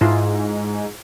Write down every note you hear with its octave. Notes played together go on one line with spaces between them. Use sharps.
G#2 E4 F4 G#4